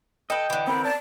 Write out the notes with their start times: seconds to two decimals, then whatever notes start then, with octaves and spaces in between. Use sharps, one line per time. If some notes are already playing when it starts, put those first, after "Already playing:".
0.30 A4 B4 D#5 G5
0.50 D3 E3
0.67 C4 A#4 B5
0.84 D5 A5